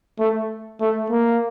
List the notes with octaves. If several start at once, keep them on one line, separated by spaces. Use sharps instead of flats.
A3
A3
A#3